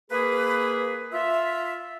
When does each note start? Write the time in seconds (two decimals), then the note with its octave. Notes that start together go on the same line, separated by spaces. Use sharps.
0.10 A#3 G#4 B4
1.13 F4 E5